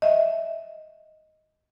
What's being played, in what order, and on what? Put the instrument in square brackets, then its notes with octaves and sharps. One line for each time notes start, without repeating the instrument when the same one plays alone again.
[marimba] D#5 E5